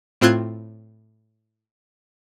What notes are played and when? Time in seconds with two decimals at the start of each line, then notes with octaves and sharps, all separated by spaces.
0.21 A2 C4 F4 C6 F#6 G#6